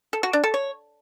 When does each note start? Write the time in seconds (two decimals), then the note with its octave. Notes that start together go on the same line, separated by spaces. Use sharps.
0.13 A4
0.23 F#4
0.33 D4
0.44 A4
0.54 C#5